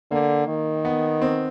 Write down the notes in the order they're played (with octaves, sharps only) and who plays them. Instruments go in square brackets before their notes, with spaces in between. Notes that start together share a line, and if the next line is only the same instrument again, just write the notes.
[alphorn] D3 [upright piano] A#3
[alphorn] D#3
[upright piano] B3
C4